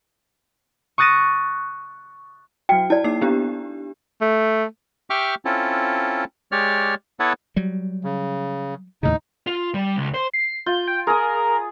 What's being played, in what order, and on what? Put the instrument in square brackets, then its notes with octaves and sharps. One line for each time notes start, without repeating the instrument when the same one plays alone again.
[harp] C#6 D#6 F#6 A6 A#6 D#7
[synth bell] F#3 F#4 [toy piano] G5
[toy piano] E4 D5 [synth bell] A5
[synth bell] A#3 D#4 C7
B3 D4 G4
[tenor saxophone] A3
[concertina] G4 E5 G5 C#6 D6 F6
C4 C#4 E4 F4 A4
G#3 G4 C#5 D5 F6
B3 E4 A4 B4 C#5 F#5
[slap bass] F#3 G3
[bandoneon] C#3
[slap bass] D#2 A2 C#3 [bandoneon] D#4
[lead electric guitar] F4
G3
C#2
C5
[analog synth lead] C7
[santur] F4 [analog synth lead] G6
[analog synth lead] G5
[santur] G#4 D#6 [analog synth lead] A#4